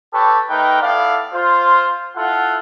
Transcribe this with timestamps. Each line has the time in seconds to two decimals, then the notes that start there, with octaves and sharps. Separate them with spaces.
0.13 G4 A4 B4 C#5 G5 A5
0.49 A3 D#4 A#4 B4 G5
0.81 B3 E4 A4 D5 F5
1.33 F4 C5
2.15 E4 F4 A4 F#5